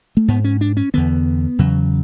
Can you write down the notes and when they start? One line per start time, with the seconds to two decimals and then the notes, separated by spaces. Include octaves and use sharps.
0.17 A3
0.28 G#2 B3
0.44 C#4
0.61 D4
0.77 C#4
0.94 E2 D3 B3
1.59 E2 C#3 F#3